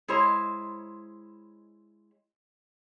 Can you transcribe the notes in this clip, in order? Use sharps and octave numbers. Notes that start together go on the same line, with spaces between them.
G#3 E4 C5 C#5 A#5